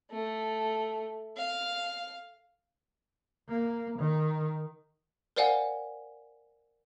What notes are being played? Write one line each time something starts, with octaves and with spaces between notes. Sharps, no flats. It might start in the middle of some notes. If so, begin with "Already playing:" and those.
A3
F5
A#3
D#3
A#4 C5 D5 F5 F#5 G#5